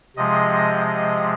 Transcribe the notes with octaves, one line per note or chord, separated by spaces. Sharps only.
C3 F3 G#3 D#5
D#5